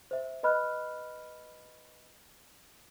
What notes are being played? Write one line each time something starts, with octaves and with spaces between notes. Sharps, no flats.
C5 E5
B4 D#5 B5 F6 F#6